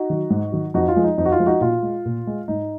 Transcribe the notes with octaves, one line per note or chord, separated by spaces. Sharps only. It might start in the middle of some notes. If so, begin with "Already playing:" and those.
Already playing: D#4 F#4
D#3 F#3
G#2
D#3 F#3
F2 D#4 F#4
F4
F3 G#3
D#4
F2 D#4
F#4
F4
F3 G#3
D#4 F#4
A#2 F4
G#3
A#2
G#3
G#2 D#4